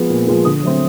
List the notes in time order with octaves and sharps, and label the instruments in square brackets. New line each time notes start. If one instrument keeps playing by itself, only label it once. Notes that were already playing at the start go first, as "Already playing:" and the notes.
Already playing: [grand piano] F3 G#3 B3
A#2
F3 G#3 B3
D3 D#6
F#3 A3 C4